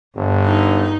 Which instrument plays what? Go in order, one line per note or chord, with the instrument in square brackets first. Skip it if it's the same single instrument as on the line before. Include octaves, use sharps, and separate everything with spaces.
[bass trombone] G1 [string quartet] G2
[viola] D#4